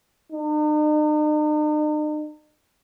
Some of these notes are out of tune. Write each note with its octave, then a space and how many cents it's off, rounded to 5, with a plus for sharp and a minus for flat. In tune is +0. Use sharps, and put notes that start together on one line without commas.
D#4 -45